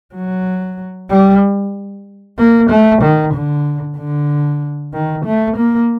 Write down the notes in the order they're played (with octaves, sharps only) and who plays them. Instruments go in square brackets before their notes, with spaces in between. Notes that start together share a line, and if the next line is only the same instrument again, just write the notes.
[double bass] F#3
G3
A#3
A3
D#3
D3
D3
D#3
A3
A#3